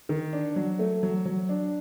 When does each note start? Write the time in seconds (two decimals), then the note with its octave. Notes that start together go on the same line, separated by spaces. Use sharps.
0.09 D#3
0.33 D4
0.56 F#3
0.79 A3
1.03 F#3
1.25 F#3
1.49 D4